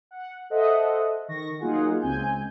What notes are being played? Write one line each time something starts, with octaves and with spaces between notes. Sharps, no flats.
F#5
A4 C5 D#5 E5 F#5
D#3 C#6 A#6
F#3 A#3 D#4 F4 G#4 F#5
C#2 C4 G#5 G6